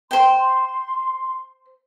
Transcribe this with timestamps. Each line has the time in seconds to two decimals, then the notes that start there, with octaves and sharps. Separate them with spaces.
0.11 C5 G5 C6